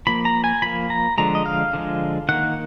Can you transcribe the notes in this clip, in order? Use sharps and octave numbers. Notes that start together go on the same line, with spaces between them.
F3 A#3 B5
A#5
G#5
F3 A#3 B5
A#5
D3 F3 G#3 A#5
D#5
F5
D3 F3 G#3
D#3 A#3 F#5